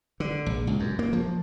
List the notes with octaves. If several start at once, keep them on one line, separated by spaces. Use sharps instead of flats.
D3
A#1
C#2
F#2
A#3
F3